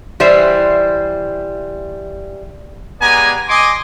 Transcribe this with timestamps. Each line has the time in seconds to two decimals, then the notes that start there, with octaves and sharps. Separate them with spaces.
0.20 E3 G3 C5 E5
3.00 G#3 B3 G4 D5 G#5 A#5
3.49 D#5 G#5 C6 D6